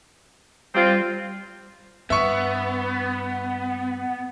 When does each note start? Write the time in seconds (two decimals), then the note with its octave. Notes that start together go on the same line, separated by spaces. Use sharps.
0.75 G3 C4 F4
2.10 G2 B3 E5 C#6